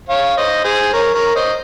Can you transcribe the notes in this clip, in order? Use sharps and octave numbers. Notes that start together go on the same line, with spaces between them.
C#5 F5
C5 D#5
G#4 C5
A#4 C#5
A#4 C#5
C5 D#5